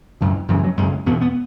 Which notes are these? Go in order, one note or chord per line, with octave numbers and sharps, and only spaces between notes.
F#2 C#3
F#2 C#3 E3
F#3
F#2 C#3 G#3
E2 B2 B3
B3